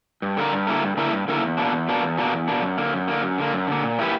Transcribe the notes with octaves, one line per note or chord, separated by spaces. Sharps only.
G2
D3 A#3 E4 A#4
G2
D3 A#3 E4 A#4
G2
D3 A#3 E4 A#4
G2
D3 A#3 E4 A#4
E2
B2 A#3 D4
E2
B2 A#3 D4
E2
B2 A#3 D4
E2
B2 A#3 D4
F#2
D3 A#3
F#2
D3 A#3
F#2
D3 A#3
F#2
D3 A#3
A#2
A#3 E4 G4 B4